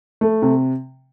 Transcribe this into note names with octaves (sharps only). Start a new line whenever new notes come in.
A3
C3